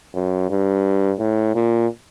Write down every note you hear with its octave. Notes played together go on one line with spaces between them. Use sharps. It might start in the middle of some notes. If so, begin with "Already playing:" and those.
F#2
G2
A2
A#2